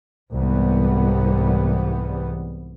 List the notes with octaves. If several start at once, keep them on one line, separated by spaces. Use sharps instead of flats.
C2 G#2 E3 G3 B3